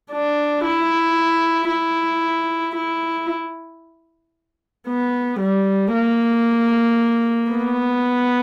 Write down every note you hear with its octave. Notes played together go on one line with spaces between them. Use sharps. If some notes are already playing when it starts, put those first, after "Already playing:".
D4
E4
E4
E4
B3
G3
A#3
B3